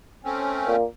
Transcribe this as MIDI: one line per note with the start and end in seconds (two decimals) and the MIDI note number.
0.24 0.76 57
0.24 0.76 60
0.24 0.76 61
0.66 0.83 46
0.66 0.83 58